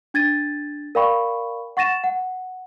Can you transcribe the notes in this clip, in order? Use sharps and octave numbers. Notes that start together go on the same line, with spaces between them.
D4 G#6 A6 D#7
A#4 D5 F5 G5 B5 C#6
F#5 C#6 A6 A#6 D#7 E7
F#5